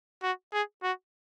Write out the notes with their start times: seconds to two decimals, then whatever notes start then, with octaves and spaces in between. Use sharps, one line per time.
0.22 F#4
0.53 G#4
0.83 F#4